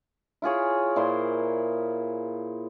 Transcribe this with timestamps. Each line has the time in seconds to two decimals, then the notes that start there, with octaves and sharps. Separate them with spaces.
0.42 E4 F4 G#4 C#5
0.96 A#2 E4 C5 C6